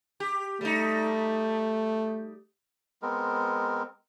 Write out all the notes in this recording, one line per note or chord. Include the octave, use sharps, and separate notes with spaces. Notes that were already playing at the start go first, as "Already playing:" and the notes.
G4
G3 A3 D#4
G#3 B3 C4 A#4